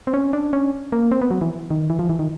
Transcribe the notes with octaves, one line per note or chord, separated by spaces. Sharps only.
C4
C#4
D4
C#4
A#3
C4
B3
F#3
E3
D#3
E3
F3
E3
D#3